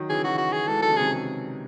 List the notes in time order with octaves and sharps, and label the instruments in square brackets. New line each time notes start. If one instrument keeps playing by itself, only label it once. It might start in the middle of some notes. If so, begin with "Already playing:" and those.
Already playing: [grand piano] D#3 F#3
[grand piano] C#3 E3 [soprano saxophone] G#4
[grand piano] D#3 F#3 [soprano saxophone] F#4
[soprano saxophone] F#4
G#4
[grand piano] E3 G#3 [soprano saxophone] A4
[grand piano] D#3 F#3 [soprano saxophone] A4
[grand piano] C#3 E3
[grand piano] C3 D#3 [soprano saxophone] G#4